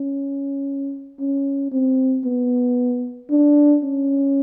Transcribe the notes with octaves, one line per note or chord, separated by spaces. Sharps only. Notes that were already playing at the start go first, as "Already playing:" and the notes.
Already playing: C#4
C#4
C4
B3
D4
C#4